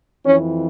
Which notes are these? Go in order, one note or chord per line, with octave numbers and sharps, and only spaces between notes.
F2 E3 C#4